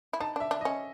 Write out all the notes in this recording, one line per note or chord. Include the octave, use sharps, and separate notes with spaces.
E4
D#4 A5
D4 E5
D4
D#5
C#4